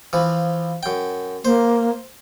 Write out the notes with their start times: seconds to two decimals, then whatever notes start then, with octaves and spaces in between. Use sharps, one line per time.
0.13 E3 F3
0.83 F#2 G5
1.45 A#3 C5